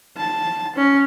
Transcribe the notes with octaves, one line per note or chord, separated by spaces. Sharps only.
A5
C#4